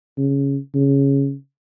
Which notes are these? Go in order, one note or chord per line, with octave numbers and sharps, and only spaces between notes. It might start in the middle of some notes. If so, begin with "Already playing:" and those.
C#3
C#3